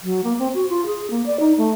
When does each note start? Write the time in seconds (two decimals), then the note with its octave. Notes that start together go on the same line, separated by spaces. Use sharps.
0.03 F#3
0.24 A#3
0.39 C4
0.54 F#4
0.69 F4
0.86 G#4
1.10 A#3
1.26 D5
1.40 D#4
1.58 A3